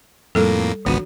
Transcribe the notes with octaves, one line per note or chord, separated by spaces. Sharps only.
F2 A2 G3 A#3 A4
G#1 C#2 E3 B3 D4 F#4